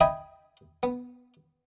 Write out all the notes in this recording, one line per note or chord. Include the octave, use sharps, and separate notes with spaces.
D#5 E5 G5 G#5 B5
B3